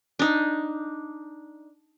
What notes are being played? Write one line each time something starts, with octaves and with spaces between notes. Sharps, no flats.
D4 D#4